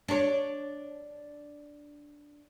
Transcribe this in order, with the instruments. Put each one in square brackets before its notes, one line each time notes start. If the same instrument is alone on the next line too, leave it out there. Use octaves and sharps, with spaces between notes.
[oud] D4 C#5